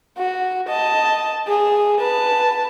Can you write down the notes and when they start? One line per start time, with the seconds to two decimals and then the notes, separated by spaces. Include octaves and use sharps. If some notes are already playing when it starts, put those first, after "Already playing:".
0.18 F#4
0.69 D#5 A5
1.48 G#4
2.00 B4 A5